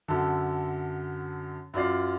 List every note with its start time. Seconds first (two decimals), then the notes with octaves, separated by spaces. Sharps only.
0.08 F#2 D3 A4
1.74 F#2 F4 D5 C7